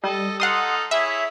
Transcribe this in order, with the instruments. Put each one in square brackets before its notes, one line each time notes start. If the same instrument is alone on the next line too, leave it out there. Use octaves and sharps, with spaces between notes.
[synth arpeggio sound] G3 [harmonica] A4 D#5
[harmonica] D#4 A4 F6 [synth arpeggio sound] F#5 C6 D#6
[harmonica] E4 G#4 C#5 [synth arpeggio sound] E5